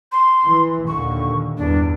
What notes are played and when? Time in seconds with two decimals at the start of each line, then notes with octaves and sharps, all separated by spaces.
0.12 C6
0.47 E3
0.87 D#2 A#2 D3 C#6
1.57 E2 G2 D4